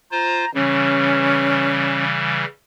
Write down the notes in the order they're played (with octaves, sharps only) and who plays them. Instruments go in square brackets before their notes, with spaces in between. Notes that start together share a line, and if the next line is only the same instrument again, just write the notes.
[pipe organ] F4 C5 [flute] A#5
[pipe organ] C#3 E3 G3 [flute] C#4